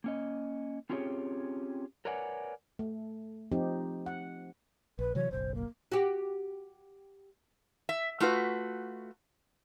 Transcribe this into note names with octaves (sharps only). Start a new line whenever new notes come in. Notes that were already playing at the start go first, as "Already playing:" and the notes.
A#3 C#4 D#5
C4 C#4 F4 G4 G#4 C#5
A#4 B4 C#5 D5 F#5 G#5
A3
F3 C4 D#4 G4
F#5
A#1 B4
C3 E3 F#3 C#5
F#1 B1 C5
A#3
F#4 G4
E5
A3 F4 F#4 B4